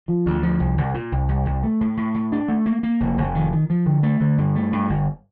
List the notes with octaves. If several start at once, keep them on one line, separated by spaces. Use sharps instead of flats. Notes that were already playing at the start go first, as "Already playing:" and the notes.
F3
D2
F3
C2
C2
A#2
C2
C2
C2
A3
A2
A2
A2
D4
A3
A#3
A#3
F1
F1
D#3
D#3
F3
D3
A3
D3
G2
A3
G2
G1